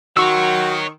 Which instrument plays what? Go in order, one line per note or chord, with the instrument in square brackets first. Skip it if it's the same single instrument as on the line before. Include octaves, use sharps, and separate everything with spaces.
[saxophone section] D#3 [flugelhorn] F#4 [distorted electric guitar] C#5 F#5 [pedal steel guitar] C6 C#6 E6